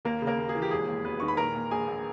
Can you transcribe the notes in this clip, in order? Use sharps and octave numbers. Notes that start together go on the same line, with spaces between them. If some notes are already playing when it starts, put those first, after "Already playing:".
D#2 A#3 A#4
C#3
A#3 A#4
D#2
G#4
E3
G4
E1 G#4
D#2
E1 B3 B4
D#3 C#6
B5
A#2 A#4 A#5
A#2
A#1 G#4 G#5
A#1